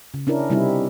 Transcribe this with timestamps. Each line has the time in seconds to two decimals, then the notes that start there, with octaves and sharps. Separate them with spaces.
0.14 C#3
0.27 C#4 D4 E4 A#4
0.50 C3 G3 C4 D#4 E4